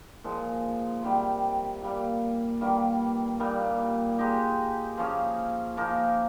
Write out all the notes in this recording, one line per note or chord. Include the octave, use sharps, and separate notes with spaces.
A#2 F3 G#3 D#4
C3 D#3 G3
A#2 G3 A#3
G2 D#3 G3 A#3
A#2 G3 A#3 D#4
G#3 D#4 G4
F3 A#3 C#4 G#4
F3 A#3 D#4